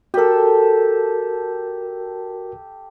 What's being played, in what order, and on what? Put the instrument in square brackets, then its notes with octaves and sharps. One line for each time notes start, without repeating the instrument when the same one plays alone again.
[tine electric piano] F#4 A#4 [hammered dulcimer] G4 A4